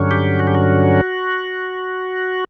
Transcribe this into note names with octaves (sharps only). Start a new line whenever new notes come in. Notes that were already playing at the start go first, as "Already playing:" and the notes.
Already playing: G2 D3 F#3 C#4
G4
F#4
G4
F#4